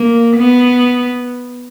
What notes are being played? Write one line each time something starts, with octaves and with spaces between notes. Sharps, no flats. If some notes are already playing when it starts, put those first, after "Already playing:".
Already playing: A#3
B3